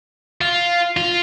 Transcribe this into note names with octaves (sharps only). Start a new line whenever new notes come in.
F4
F4